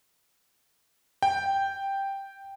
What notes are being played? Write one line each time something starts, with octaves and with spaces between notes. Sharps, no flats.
G5